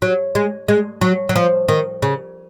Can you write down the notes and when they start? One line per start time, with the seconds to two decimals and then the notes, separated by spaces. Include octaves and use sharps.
0.02 F#3
0.35 G#3
0.68 G#3
1.01 F#3
1.29 F#3
1.36 F3
1.68 D#3
2.02 C#3